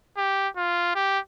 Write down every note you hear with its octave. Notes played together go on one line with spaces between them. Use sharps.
G4
F4
G4